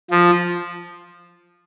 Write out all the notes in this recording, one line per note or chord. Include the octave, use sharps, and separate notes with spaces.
F3